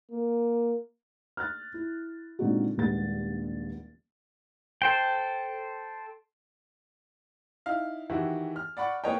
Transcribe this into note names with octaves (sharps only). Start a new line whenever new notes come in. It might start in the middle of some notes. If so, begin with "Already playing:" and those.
A#3
F6 F#6 A6
E4
A#2 D3 G#3 C4 D#4 F#4
D#1 A#1 G3 G#3 B3 A6
A4 C5 G5
D#4 E4 F5
D#3 E3 E4 F#4 G4
F6
D5 F#5 B5 C#6
A#3 B4 C#5 D#5 G5